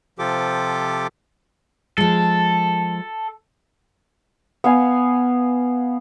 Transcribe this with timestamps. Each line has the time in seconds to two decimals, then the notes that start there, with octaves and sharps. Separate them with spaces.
0.19 C3 F3 F4 G4 A4 D6
1.98 F3 G#3 A4
4.64 B3 F5 G#5